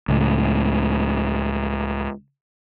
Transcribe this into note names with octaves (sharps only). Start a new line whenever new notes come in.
C#2 A2